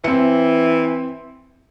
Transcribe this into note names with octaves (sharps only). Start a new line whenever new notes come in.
E3 C4 C#7